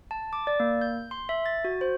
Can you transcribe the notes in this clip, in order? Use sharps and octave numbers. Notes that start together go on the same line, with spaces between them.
A5
D6
D5
A#3
G6
C6
E5
A6
F#4
C5